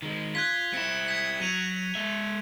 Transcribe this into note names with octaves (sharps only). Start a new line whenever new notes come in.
D#3 G#3
F4 F#6 G#6 B6
C4 E4 C#7 E7
G#6 B6 C#7
F#3 G#6 D#7 F7
G#3 E5